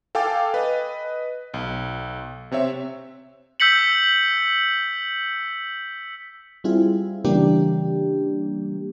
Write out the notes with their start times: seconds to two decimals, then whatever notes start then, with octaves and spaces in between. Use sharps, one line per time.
0.15 A4 F5 G5 G#5 D6 A6
0.54 B4 D#5
1.54 B1
2.51 C3 C4 C#5 E5
3.60 E6 G6 B6 C#7 F#7
6.64 G3 C4 E4 F4 G#4
7.25 C#3 E3 G3 A#3 D4 G4